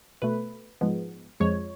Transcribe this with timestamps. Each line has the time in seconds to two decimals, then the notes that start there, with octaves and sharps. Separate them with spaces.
0.22 B2 A3 B4
0.81 G#2 F3 G#3 B3
1.40 F2 F3 G#3 C#5